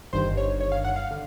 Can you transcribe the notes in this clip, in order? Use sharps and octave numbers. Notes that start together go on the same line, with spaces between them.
G1 G2 D#3 C5
C#5
C#5
F5
F#5
F5
D3